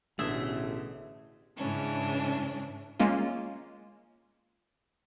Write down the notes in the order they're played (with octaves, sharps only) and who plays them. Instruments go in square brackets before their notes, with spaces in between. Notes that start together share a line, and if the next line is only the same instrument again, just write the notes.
[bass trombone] A1 [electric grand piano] B2 D3 [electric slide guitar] A3 [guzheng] G#4 E5
[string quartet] G#2 C#3 E3 C#4 D4
[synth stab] G#3 A#3 C#4 F4